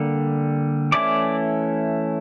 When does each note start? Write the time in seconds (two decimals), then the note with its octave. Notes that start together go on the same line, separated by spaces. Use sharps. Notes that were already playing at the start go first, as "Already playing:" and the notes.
Already playing: D3 G3 A#3
0.92 E3 A3 C#4 E4 D5 D6